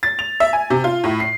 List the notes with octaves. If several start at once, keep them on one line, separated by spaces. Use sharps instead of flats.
A6
F7
E5
G#5
C3
F4
A2
C7